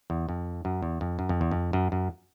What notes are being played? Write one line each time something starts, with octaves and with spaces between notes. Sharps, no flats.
E2
F2
F#2
E2
F2
F#2
F2
E2
F2
F#2
F#2